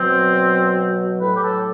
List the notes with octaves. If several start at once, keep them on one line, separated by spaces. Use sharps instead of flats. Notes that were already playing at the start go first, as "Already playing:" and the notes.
Already playing: B2 F#3 C4
A2 F#3 B4
G4
A4